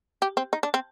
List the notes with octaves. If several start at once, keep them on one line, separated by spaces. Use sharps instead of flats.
G4
C4
D#4
D4
C4